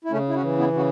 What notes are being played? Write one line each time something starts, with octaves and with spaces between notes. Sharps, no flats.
E4
C#3 A3 C#4
E4
C#4 F#4
E3
B3 E4
C#3 F#4